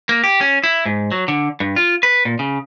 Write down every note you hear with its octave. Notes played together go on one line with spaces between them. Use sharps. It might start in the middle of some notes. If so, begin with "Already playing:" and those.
A#3
G4
C#4
E4
G#2
F#3
D3
G2
F4
B4
A#2
C#3